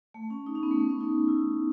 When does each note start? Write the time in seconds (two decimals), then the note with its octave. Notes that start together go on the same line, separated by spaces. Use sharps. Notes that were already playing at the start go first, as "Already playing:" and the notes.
0.14 A3
0.30 C#4
0.46 D#4
0.55 C#4
0.63 B3
0.71 A3
0.79 B3
0.89 C#4
1.01 D#4
1.28 E4